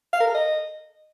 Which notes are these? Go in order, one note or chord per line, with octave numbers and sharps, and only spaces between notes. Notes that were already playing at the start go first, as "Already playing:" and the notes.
F5
A#4
A4
D#5